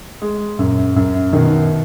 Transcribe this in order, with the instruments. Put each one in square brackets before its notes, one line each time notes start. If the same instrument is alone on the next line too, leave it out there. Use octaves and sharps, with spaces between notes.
[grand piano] G#3
[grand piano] F#2 [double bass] A#2
[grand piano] F#2
[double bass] B2 [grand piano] D#3